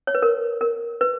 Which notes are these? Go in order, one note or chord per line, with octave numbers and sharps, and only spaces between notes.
C#5
B4
A#4
A#4
B4